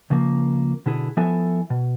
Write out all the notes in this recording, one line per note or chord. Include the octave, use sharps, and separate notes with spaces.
C#2 C#3 F3 A#3
B2 D3 E4 G#4
F3 B3 E4 A4 E5 G#5
B2